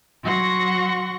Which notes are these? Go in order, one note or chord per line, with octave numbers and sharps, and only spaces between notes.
F#3 F#4 F#5 C6 C#6 A#6